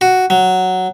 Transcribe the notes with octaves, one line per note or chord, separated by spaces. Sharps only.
F#4
F#3